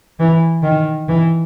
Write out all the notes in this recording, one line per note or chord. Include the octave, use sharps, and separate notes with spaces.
E3
D#3
E3